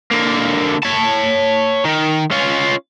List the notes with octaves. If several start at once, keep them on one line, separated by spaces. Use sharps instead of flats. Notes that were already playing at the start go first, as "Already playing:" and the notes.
D3 A#3
C#5 A5
D#3
C#4 F4